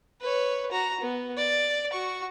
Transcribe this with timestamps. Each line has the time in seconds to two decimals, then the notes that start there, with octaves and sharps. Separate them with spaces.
0.21 B4 C#5
0.71 F#4 A#5
1.01 B3
1.37 D5
1.92 F#4 C#6